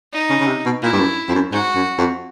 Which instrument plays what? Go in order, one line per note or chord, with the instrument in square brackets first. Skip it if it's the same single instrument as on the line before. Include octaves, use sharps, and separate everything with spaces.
[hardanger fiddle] D#4
[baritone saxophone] C#3
C#3
C3
B2
[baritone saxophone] A#2 [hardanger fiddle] E4
[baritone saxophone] G2
F#2
F2
F#2
[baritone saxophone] G#2 [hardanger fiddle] F#4
[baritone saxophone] F#2
F2